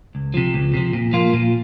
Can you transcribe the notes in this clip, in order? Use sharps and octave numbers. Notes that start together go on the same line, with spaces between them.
C#2
C3 F3
C#2
C3 F3
A#2
F3 A#3 F4
A#2